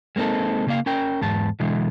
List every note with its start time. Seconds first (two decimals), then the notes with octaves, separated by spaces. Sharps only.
0.16 G#3 A#3 C4 D#4 A4
0.67 C#3 A#3 F5
0.86 C#4 A#4 G5
1.21 E2 G#2 A5
1.60 B2 D3 E3 G#3